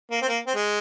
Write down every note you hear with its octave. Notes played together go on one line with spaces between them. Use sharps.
A#3
C4
A#3
C4
G#3